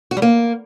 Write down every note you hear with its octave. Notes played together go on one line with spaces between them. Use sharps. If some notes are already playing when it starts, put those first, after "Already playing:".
F#4
G3
A#3